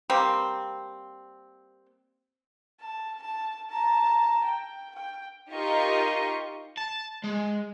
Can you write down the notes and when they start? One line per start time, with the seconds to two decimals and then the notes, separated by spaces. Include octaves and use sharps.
0.10 G3 A#3 C4
2.80 A5
3.22 A5
3.70 A5 A#5
4.45 G5
4.95 G5
5.52 D#4 F4 G4 A#4 D#5 C#6
6.77 A5
7.24 G#3